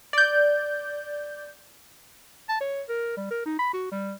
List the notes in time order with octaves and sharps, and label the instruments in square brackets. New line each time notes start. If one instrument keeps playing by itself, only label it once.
[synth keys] D5 G6
[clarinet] A5
C#5
A#4
G3
A#4
D#4
B5
F#4
G3